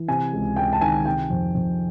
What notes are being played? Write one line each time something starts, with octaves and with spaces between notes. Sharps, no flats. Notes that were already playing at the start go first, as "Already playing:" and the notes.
Already playing: E3
C3 G#5
C#2
C#2 G5
A5
D#3 G#5
C3 G5
F2
F2